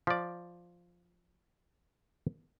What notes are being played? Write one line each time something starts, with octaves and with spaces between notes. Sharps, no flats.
F3 D5